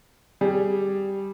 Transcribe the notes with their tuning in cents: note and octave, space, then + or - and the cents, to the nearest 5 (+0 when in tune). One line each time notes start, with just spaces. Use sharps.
G3 +0 G#4 -5